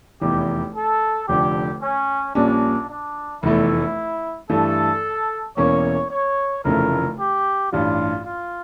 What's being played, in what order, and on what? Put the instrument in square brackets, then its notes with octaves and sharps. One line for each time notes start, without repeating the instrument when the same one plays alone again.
[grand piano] F1 E2 E3 [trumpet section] G4
[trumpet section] A4
[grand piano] F1 F2 D3 [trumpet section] G4
[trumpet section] C#4
[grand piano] A#1 A#2 G3 C#4 [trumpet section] D4
[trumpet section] D4
[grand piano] F1 E2 E3 A3 [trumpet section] E4
[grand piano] G2 E3 A3 [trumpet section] A4
[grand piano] E1 E2 E3 A#3 C#4 [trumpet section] C#5
[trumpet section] C#5
[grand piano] F1 F2 C#3 E3 A3 [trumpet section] A#4
[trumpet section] G4
[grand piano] A1 G2 E3 G3 D4 [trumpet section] F4
[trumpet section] F4